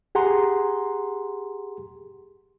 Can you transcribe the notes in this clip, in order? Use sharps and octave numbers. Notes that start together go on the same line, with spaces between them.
G4 G#4 F#5 A#5 C6